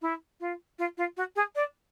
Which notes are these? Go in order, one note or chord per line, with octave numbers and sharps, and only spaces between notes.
E4
F4
F4
F4
F#4
G#4
D5